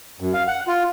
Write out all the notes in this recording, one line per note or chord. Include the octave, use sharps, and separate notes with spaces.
F#2
F5
F#5
F4